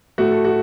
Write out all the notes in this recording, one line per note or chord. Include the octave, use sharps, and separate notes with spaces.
A2 A3 F#4
A4
F#4